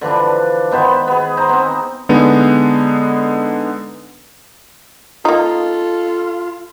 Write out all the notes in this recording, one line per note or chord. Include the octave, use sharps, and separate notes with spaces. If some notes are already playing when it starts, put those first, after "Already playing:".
D3 E3 F3 D4
D#3 B3 C5 B5
B3 G#4
D#4 C5 A#5
B3 C4
D3 G#3 B3 D#4
A#3 D#4 F4 A4